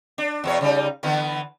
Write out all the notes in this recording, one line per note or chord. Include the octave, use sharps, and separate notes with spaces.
D4
E2 B2 C#5
C#3 G3 D#4
D3 E3 B3